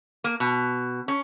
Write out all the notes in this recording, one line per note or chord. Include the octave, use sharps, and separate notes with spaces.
A#3
B2
C#4